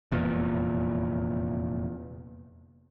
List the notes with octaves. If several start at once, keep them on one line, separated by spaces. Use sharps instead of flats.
F1 E2 A#2